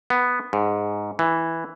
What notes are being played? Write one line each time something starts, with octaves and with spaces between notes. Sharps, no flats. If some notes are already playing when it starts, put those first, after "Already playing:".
B3
G#2
E3